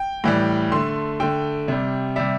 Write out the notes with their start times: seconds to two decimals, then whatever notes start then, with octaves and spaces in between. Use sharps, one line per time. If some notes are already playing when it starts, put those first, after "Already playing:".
Already playing: G5
0.24 A2 E3 G3
0.72 D3 A3 C6
1.20 D3 A3 G5
1.68 C3 G3
2.16 C3 G3 E5